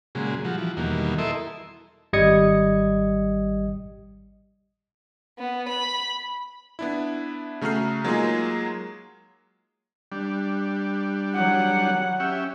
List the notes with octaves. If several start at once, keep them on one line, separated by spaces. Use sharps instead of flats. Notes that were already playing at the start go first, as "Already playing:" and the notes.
A#2 C#3 F#3 G#3
F3 G3 F#4
E3 F3
E2 B2 D#3 F#3 G3 A#3
E4 A4 A#4 D#5 E5 C6
G#1 G3 D#5 D#6 G#6 C#7
B3
B5
B3 D4 E4
C#3 A3 F#4 A#5 F6 C7
F#3 G#3 A#3 D#4 F4 G#4
G3 D4
F#3 F#5
C#4 G4 E5